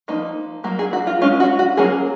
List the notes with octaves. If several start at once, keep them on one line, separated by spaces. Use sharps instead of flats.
F3 A#3 D#4
F#3 A#3
G#4
F#4
F4
G#3 C#4 F4
F#4
F#4
F#3 A#3 C#4 G#4